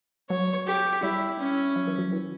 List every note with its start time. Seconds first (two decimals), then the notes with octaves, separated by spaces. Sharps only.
0.30 F#3 C#5
0.67 G4
1.03 G3 E4
1.39 C#4
1.76 F#3
1.87 E3
1.98 F#3
2.12 E3